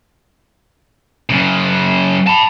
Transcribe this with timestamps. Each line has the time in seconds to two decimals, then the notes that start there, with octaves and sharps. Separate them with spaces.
1.30 F#2 C#3
2.27 A5 B5